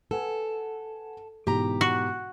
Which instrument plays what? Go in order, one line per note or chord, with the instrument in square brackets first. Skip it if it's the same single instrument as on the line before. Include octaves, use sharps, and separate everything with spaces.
[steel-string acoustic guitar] A4 [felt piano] B4 F#5 G#5
[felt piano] G#2 B2 E3 [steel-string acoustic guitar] G4 A#5
[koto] F#4